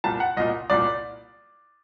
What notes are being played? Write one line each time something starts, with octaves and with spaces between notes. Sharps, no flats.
C2 A#2 A5
F#5
C2 A#2 D#5
C2 A#2 D5